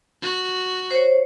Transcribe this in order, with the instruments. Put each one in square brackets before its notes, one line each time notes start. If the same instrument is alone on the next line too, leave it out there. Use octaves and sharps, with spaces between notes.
[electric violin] F#4
[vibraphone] C5 C#5